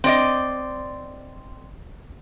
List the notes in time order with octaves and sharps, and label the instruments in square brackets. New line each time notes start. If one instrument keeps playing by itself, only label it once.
[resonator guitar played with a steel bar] C4 D5 D#5